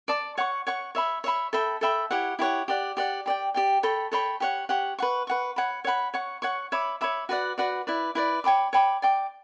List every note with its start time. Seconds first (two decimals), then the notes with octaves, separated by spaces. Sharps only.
0.08 D5 A5 D6
0.38 C#5 F#5 C#6
0.67 C#5 F#5 C#6
0.95 C#5 E5 B5
1.24 C#5 E5 B5
1.53 A4 E5 G5 B5
1.81 A4 E5 G5 B5
2.11 E4 G4 C#5 F#5
2.39 E4 G4 C#5 F#5
2.68 G4 D5 F#5
2.97 G4 D5 F#5
3.26 G4 D5 G5
3.54 G4 D5 G5
3.83 A4 C#5 G5 B5
4.12 A4 C#5 G5 B5
4.40 G4 C#5 F#5
4.69 G4 C#5 F#5
4.99 B4 F#5 C#6
5.27 B4 F#5 C#6
5.56 C#5 F#5 B5
5.84 C#5 F#5 B5
6.14 C#5 F#5 C#6
6.42 C#5 F#5 C#6
6.72 C#5 E5 B5 D6
7.01 C#5 E5 B5 D6
7.29 F#4 B4 D5 F#5
7.58 F#4 B4 D5 F#5
7.87 E4 B4 D5
8.15 E4 B4 D5
8.44 C#5 G5 B5 D6
8.73 C#5 G5 B5 D6
9.02 D5 G5 D6